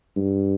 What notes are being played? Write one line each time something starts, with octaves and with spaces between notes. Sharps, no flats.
G2